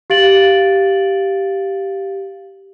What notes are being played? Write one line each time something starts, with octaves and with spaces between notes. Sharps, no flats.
G4 F5 A6 D7 F#7